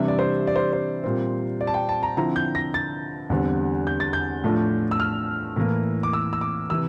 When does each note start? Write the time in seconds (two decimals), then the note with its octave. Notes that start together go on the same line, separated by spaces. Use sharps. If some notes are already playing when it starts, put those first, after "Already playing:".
Already playing: C3 E3 G3 D4 E5
0.08 D5
0.19 C5
0.47 D5
0.56 C5
0.73 C5
1.04 A#2 G3 C4
1.61 D5
1.67 A5
1.74 G5
1.89 A5
2.03 A#5
2.17 D3 F3 C4 E4 A#5
2.36 G6
2.55 A#6
2.74 A6
3.30 E2 D3 G3 C4
3.87 G6
4.00 A6
4.13 G6
4.44 A2 F3 A3 D4 F4
4.91 E6
5.00 F6
5.56 A2 E3 A#3
6.03 D6
6.13 E6
6.33 E6
6.41 D6
6.70 C3 E3 E6